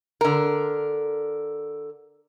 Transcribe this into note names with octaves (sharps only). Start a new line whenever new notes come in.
D3 A#4